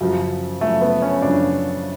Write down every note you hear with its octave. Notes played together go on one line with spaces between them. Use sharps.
F#2 C#3 F3 F#3
F#2 C#3 F3 A3
B3
C#4
F#2 C#3 F3 D4